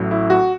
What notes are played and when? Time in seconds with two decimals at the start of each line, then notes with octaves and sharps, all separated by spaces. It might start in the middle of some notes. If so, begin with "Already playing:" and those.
Already playing: A1 A2 F#3
0.11 E4
0.30 F#4